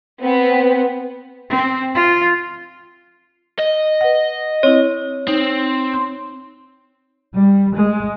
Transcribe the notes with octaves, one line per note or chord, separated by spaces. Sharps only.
B3 C4
C4
F4
D#5
B4 F#5
C4 E4 C#5
C4 D#4
C6
G3
G#3